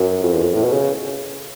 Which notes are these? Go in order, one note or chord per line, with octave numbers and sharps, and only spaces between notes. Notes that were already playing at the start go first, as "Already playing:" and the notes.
Already playing: F#2
F2
E2
F2
A2
B2
C#3